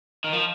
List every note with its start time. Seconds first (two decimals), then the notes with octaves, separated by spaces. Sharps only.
0.24 D#3
0.33 F3